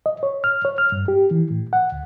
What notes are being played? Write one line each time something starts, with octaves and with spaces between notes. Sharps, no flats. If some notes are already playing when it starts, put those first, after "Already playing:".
D#5
C#5
F6
C#5
F6
G2
G4
E3
A2
F#5
D2